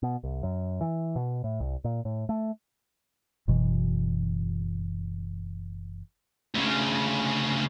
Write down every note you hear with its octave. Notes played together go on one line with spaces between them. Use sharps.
B2
C2
F#2
E3
B2
A2
C2
A#2
A2
A3
F#1 B2 E3
D2 C#3